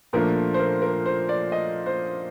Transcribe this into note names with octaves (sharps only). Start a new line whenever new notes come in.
A#2 F3 A3 D4 A#4
C5
A#4
A#4
C5
D5
D#5
C5